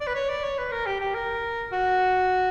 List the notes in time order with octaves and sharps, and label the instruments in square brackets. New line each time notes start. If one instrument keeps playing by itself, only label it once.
[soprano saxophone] D5
B4
C#5
D5
C#5
B4
A#4
G4
G4
A#4
F#4